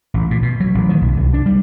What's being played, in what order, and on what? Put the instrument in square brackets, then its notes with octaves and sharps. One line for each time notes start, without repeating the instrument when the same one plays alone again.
[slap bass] A1
A#2
B2
F#3
A1
D#3
B1
C2
D4
G3